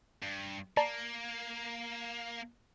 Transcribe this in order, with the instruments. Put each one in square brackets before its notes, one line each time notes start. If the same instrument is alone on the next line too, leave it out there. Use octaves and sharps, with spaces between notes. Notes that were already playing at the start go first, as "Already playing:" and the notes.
[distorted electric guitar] G2
[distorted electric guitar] A#3 [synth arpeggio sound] D5 A5 A#5